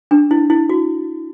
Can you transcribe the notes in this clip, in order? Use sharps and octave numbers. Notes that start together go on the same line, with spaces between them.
D4
E4
E4
F#4